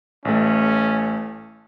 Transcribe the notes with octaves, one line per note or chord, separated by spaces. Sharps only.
A1 A3 C#4